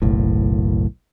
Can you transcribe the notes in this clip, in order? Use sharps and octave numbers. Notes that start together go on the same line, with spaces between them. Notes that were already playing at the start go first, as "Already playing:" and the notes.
F#1 B1 A2